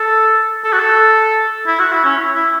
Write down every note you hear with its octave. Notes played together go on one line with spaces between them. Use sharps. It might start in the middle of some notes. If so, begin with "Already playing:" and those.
Already playing: A4
A4
F#4
A4
E4
F#4
E4
C#4
E4
E4